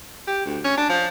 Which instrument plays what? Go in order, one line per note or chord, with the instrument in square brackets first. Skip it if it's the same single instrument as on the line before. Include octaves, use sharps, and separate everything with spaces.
[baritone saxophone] G4
D2
C#4
D4
F3